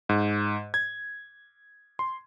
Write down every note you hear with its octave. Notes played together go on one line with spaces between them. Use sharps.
G#2
G#6
C6